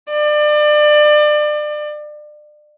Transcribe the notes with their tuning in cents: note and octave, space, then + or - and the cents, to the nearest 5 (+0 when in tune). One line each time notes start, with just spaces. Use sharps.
D5 +30